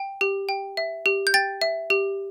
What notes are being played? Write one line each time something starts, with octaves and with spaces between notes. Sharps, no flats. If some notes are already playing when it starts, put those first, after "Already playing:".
Already playing: G5
G4
G5
E5
G4
G6
G5 A6
E5
G4